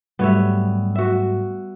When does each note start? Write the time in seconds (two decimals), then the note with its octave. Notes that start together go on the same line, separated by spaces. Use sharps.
0.19 G#2 F#3 G3 A3 B3 C#5 E5
0.95 F#4 E5